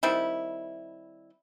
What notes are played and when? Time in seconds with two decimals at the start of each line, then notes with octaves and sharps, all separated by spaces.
0.03 D#3 G3 C4 E4